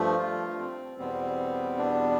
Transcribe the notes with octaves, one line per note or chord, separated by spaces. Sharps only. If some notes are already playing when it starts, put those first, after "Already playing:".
Already playing: G2 F3 A3
F4
C4
E2 B2 G3 B3 C4
D4